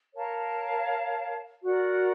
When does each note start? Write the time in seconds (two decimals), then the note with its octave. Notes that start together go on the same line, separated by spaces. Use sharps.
0.14 A#4 C#5 F5 A5
1.62 F#4 A#4 D5 F#5